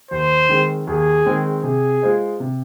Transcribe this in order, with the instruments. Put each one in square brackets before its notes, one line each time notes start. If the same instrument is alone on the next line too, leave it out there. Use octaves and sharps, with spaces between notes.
[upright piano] D#2 [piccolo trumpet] C5
[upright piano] D#3 G#3 C4
[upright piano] D#2 [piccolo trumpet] G#4
[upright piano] D#3 G#3 C4
[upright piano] C3 [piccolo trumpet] G#4
[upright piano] G#3 F4 C5 D#5
C3